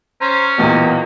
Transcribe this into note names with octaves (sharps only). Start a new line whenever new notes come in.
C#4 C5 A#5
B1 E2 A#2 A#3 B3 G4